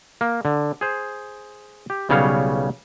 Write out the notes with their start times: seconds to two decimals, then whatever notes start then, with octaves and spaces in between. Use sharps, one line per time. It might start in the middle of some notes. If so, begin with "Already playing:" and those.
0.21 A#3
0.45 D3
0.81 G#4 C5
1.90 G4
2.09 B1 C#3 G3 B3 C#5 F5